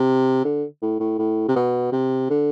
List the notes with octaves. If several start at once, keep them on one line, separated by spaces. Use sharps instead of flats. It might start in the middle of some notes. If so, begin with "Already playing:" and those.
Already playing: C3
D3
A2
A2
A2
C3
B2
C3
D3